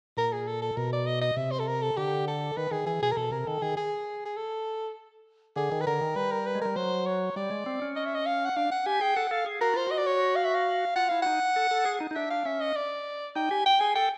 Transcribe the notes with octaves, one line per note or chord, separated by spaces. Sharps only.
A#2 A#4
G#4
A4
A4
B2 A#4
D5
D#5
D#5
C3 E5
C5
A4
A#4
A4
D3 G4
A4
D#3 B4
D#3 G#4
E3 G#4
B2 G#4
A#4
B2 A4
C3 A#4
D#3 A4
D#3 G#4
G#4
G#4
A4
D3 G#4
D#3
B4
D3 A#4
D#3
G3 B4
A#4
B4
G#3
G3 A#4
F#3 C5
C#5
G3 D5
G#3
C4
C#4
D#5
E5
D#5
F5
F#5
D4 F5
F#5
G4 G#5
G#4 G5
A4 F#5
A4 F5
G#4
F#4 A#4
F4 C5
F#4 D#5
D5
C#5
F5
E5
F5
F4 F#5
E4 F5
D#4 F#5
A4
A4
G#4
D#4
D#4
D4 E5
F5
C#4 E5
D#5
D5
D#4 G5
G4 G#5
G5
G#4 G#5
A4 G5